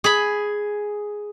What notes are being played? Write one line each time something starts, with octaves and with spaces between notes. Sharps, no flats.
G#4 B5